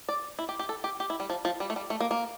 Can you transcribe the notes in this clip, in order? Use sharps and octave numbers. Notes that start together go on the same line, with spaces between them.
D5
E4
G4
G4
A4
G4
G4
E4
G3
F3
F3
G3
A3
G3
A3
A#3
A#3